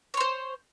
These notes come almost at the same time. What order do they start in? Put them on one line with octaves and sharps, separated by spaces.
C#5 C6 C5